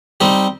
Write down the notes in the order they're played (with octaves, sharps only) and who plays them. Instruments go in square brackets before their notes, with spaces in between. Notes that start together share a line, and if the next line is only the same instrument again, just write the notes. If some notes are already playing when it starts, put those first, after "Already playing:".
[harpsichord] G3 C4 D#4 G4